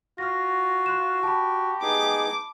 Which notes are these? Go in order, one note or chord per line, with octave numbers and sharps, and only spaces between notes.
F4 F#4 F6 A#6
C6 F#6 E7
G4 A5 B5
B3 D#4 G#4 D6